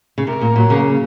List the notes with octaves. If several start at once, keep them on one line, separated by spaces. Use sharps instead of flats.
C#3
C3 A#4
A#2 A#3
A#2 F#3
C#3 A#3
A#3